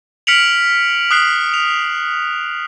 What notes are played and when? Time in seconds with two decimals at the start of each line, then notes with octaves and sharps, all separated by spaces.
0.27 F6 B6 C#7 D7 F7 F#7
1.11 D#6 F#6 C7
1.54 F7